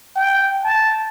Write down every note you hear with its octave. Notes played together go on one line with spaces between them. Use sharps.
G5
A5